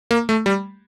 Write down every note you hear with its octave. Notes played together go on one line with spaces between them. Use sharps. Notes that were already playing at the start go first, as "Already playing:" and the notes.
A#3
A3
G3